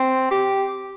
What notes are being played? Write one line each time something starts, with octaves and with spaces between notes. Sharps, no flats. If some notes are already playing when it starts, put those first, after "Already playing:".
Already playing: C4
G4